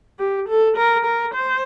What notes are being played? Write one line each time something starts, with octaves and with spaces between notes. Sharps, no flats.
G4
A4
A#4
A#4
C5